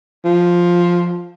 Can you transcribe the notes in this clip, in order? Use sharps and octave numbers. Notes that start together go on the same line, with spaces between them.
F3